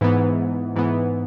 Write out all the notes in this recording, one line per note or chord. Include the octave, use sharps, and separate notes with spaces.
G#2 E3 B3
G#2 E3 B3